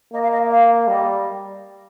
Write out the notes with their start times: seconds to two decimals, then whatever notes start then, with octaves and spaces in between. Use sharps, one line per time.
0.13 A#3 D#5
0.22 F5
0.31 D#5
0.50 F5
0.88 G3 D#5